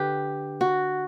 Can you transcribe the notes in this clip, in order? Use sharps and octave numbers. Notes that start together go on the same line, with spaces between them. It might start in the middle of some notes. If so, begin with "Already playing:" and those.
Already playing: D3 G4 B4
F#4